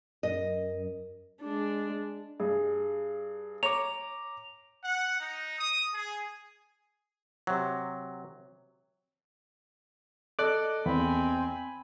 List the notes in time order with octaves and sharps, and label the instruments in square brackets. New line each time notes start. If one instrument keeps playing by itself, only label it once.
[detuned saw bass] F#2 [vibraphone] A#4 [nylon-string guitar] D#5
[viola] G#3 D4
[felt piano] G2 [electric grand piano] G#4
[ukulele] C#5 [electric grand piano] A#5 D6 [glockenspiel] F7
[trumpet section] F#5
D#4
D#6
G#4
[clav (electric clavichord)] C3 F#3
[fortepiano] A4 D5 D#5 [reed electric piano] D6 F#6
[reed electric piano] E2 [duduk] C4 [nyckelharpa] G#5 B5